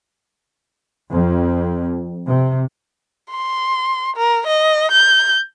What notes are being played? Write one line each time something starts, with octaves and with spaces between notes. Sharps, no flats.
F2
C3
C6
A#4
D#5
G6